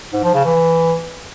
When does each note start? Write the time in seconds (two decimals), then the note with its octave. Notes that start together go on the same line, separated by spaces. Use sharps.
0.13 G#2
0.24 F3
0.34 C#3
0.45 E3